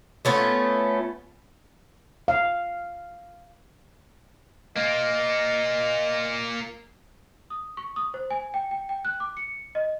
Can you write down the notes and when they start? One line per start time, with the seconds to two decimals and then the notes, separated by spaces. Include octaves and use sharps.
0.25 A3 B3 C#4 F4
2.28 F5
4.76 A#3 F4 D#5
7.50 D#6
7.77 C#6
7.96 D#6
8.14 C5
8.30 G#5
8.54 G5
8.71 G5
8.89 G5
9.05 F#6
9.20 D6
9.37 C#7
9.75 D#5